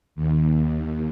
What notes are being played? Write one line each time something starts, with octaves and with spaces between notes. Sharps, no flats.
D#2